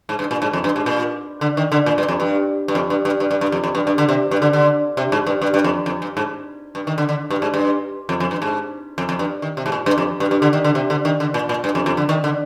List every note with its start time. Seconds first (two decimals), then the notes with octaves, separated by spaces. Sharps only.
0.09 G#2
0.19 G2
0.31 A#2
0.42 G#2
0.53 F2
0.64 G2
0.76 G#2
0.86 A#2
1.41 D3
1.57 D#3
1.72 D3
1.86 A#2
1.98 G2
2.08 F2
2.20 G2
2.68 G2
2.75 F2
2.90 G2
3.05 G2
3.20 G2
3.31 G2
3.41 G2
3.52 F2
3.64 F2
3.75 G2
3.87 G2
3.98 D3
4.09 C3
4.31 G2
4.42 D3
4.53 D3
4.97 C3
5.12 G#2
5.26 G2
5.41 G2
5.54 G2
5.64 F2
5.86 F2
6.02 G2
6.17 G#2
6.75 G2
6.87 D#3
6.98 D3
7.09 D3
7.30 G2
7.42 G#2
7.54 G2
8.09 F2
8.20 F2
8.31 G2
8.42 G#2
8.98 F2
9.09 F2
9.19 G2
9.42 D#3
9.57 C3
9.66 G#2
9.72 A#2
9.86 G2
9.98 F2
10.20 G2
10.31 G2
10.42 D3
10.53 D#3
10.64 D3
10.75 C3
10.90 D3
11.05 D#3
11.20 D3
11.34 A#2
11.49 A#2
11.64 G2
11.75 F2
11.86 F2
11.97 D3
12.09 D#3
12.24 D3